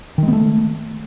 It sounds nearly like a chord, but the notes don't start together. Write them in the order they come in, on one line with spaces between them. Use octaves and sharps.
D#3 G#3 B3 A3